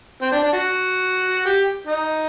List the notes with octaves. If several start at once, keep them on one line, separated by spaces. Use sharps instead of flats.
C4
D4
D4
F#4
G4
D#4